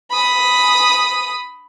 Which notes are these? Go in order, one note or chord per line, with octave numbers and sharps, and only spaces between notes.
B5 D#6